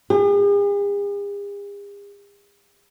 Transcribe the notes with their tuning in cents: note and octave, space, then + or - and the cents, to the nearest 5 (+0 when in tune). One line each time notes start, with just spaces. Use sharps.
G#4 -45